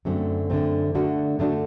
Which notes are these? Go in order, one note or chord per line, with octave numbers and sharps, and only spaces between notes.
F#2 D3 A3 C4
F#2 D3 A3 C4
D3 A3 D4 F#4
D3 A3 D4 F#4